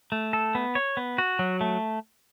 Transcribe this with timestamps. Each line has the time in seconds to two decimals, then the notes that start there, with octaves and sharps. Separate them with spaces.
0.12 A3
0.33 A4
0.55 B3
0.75 C#5
0.97 B3
1.18 F#4
1.39 F#3
1.61 A3